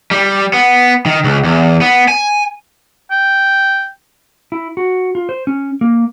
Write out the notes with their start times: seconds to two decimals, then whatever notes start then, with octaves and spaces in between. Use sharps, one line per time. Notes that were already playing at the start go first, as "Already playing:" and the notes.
0.11 G3
0.53 B3
1.06 D#3
1.24 C#2
1.45 E2
1.81 B3
2.08 G#5
3.11 G5
4.52 E4
4.77 F#4
5.15 F4
5.29 C5
5.47 C#4
5.81 A#3